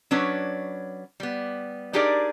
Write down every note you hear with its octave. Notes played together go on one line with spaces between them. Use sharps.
F#3 C#4 D4 B4 C#5
G3 B3
D4 D#4 G4 G#4 A#4 D5